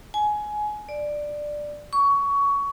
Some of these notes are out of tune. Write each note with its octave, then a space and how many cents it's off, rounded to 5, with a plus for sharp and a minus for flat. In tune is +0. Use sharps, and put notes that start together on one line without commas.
G#5 +20
D5 +10
C#6 +20